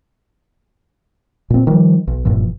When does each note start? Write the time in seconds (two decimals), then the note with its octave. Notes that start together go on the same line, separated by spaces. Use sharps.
1.50 A#2 C4
1.67 D#3 F3 G3
2.07 B1
2.25 F1 G2 A#2 E3